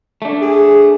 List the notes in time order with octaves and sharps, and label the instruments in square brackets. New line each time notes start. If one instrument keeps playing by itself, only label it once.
[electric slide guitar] A3 D4
[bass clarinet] G#4